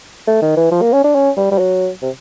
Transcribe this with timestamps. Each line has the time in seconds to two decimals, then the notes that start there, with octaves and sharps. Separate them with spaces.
0.27 A3
0.42 D#3
0.57 E3
0.71 F3
0.82 A#3
0.93 C#4
1.04 D4
1.15 C#4
1.37 G3
1.51 G3
1.59 F#3
2.03 C3